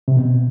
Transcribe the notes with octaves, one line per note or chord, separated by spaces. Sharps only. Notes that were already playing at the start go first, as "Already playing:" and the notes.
C3
B2